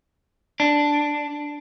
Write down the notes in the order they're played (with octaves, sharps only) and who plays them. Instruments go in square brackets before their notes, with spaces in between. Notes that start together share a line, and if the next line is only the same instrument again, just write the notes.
[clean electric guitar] D4